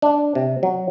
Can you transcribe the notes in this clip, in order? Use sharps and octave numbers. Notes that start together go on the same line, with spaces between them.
D4
C3
F#3